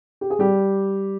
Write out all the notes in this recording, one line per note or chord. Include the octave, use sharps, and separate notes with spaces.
G4
G#4
G3 G4